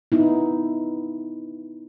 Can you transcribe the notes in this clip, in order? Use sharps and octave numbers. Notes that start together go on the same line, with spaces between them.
B3 D#4 E4